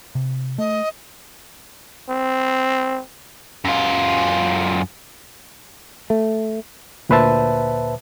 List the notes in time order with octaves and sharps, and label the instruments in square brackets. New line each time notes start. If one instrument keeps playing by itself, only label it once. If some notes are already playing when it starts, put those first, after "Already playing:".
[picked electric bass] C3
[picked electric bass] A3 [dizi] D#5
[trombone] C4
[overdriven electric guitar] F#2 F4
[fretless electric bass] A3
[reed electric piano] D2 A#2 B4 C5 E5 A5